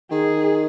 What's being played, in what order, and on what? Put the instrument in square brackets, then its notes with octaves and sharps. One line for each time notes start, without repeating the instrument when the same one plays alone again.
[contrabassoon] D#3 [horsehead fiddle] G#4